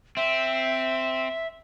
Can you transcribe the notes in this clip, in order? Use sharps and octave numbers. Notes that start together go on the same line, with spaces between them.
C4 E5